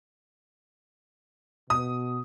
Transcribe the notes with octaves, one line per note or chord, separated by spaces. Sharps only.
B2 D#6